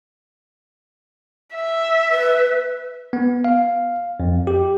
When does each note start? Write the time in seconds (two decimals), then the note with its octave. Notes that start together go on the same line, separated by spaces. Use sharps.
1.54 E5
2.10 B4
3.13 B3
3.44 F5
4.20 F2
4.47 G4